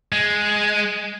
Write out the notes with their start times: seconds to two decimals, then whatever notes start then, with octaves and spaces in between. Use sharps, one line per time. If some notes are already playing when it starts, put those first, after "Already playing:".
0.12 G#3